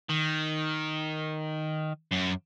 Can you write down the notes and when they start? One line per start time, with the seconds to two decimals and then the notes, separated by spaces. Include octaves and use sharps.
0.09 D#3
2.12 F#2